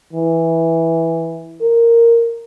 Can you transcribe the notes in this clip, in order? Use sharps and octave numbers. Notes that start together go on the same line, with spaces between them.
E3
A#4